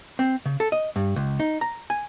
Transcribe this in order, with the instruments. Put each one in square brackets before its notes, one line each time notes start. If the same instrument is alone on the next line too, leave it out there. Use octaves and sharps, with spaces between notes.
[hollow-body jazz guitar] C4
C#3
A4
D#5
G2
C#2
D#4
A#5
G#5